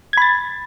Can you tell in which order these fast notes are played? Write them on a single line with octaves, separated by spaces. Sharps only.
G#6 B5 A6